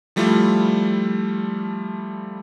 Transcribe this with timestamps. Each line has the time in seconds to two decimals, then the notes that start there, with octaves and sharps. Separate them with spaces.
0.16 F3 G3 A3 E4 F4